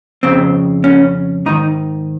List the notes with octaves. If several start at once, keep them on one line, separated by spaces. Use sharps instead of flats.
F2 C#3 C4
C#4
G#2 D#3 D#4